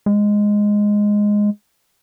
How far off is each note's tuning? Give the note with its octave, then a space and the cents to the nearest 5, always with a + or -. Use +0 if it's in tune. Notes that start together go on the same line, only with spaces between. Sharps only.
G#3 -5